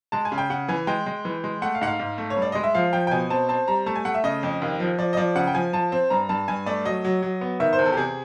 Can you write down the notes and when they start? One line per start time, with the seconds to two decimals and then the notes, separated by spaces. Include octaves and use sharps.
0.12 G#3 A5
0.25 G#5
0.32 C#3
0.38 G5
0.50 C#3 F#5
0.68 E3 G#5
0.87 G#3 G5
1.06 G#3
1.25 E3
1.44 G#3
1.62 A3 F#5
1.75 F5
1.81 G#2 F#5
1.87 F5
2.00 G#2
2.18 A3
2.30 C#5
2.36 G2
2.42 D5
2.52 G#3 D#5
2.64 E5
2.74 F3 F5
2.93 F3 G5
3.07 G5
3.11 B2 G#5
3.30 C4 A5
3.49 C4 A5
3.68 G3 A#5
3.86 A3 A5
3.96 G#5
4.05 A3 F#5
4.14 E5
4.24 C#3 D#5
4.43 F2
4.62 D#2
4.80 F3
4.98 F3 D5
5.13 D#5
5.17 F3 D5
5.36 C#3 F#5
5.47 G5
5.55 F3 G#5
5.73 F3 A5
5.92 C4
6.10 G2 A#5
6.29 G2 A5
6.48 G2 G#5
6.66 A3 D5
6.85 F#3 D#5
7.05 F#3
7.23 F#3
7.41 B3
7.60 D#3 E5
7.73 C5
7.79 E2
7.85 A4
7.92 G4
7.97 C3 G#4